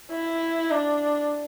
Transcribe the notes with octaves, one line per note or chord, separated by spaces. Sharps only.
E4
D4